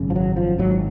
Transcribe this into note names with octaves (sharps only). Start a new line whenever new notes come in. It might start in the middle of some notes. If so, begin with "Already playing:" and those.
Already playing: G#1 F#2 C#3
F3
F#3
F3
G#1 G#2 F#3